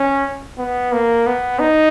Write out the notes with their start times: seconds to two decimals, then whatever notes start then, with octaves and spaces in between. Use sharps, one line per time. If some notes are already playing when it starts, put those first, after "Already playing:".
Already playing: C#4
0.57 B3
0.92 A#3
1.26 B3
1.59 D#4